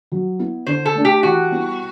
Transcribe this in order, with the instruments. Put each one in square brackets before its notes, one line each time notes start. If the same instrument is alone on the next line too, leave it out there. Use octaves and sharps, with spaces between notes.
[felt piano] F#3
B3 E4
[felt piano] D3 [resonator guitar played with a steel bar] C5
[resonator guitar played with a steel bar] A4
[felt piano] A3 D4
[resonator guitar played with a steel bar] G4
[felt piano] E3 [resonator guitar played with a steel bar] F#4
[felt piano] G3 B3 E4